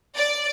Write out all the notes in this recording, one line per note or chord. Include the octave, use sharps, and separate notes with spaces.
D5